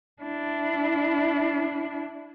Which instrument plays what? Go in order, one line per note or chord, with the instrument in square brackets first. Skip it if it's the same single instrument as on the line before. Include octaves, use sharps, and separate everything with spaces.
[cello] D4 E4